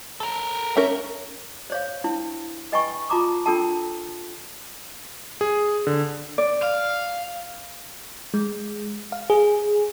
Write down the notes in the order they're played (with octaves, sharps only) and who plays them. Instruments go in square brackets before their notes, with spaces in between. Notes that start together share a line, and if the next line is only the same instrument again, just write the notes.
[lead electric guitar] A4 A#4
[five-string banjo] C#4 A#4 [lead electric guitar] E5
[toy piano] C5 C#5 F5
D4 E4
B4 D#5 G5 G#5 B5 C#6
F4 A5 A#5 D6 D#6
D4 F4 A4 A#4 G5 A5
[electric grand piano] G#4
D3
[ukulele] D5
[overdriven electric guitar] F5
[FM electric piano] G#3
F5
G#4